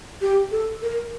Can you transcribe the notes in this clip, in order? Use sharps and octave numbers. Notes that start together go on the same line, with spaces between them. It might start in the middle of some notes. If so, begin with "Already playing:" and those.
G4
A4
A#4